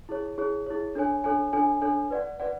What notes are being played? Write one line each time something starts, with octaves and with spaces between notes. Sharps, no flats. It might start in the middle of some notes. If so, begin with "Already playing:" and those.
E4 G#4 C#5
E4 G#4 C#5
E4 G#4 C#5
D4 A4 C#5 G#5
D4 A4 C#5 G#5
D4 A4 C#5 G#5
D4 A4 C#5 G#5
B4 D5 F#5
B4 D5 F#5